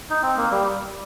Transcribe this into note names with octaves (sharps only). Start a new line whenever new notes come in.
D#4
C4
A#3
G3